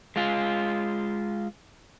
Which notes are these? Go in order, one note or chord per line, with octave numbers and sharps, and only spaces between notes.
G#3 F4